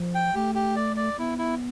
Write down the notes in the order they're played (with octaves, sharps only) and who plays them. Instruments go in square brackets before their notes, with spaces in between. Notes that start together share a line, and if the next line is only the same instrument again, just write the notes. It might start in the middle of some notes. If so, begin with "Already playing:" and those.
Already playing: [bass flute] F3
[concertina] G5
[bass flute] A3 [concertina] G4
[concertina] G4
D5
D5
[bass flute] B3 [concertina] E4
[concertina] E4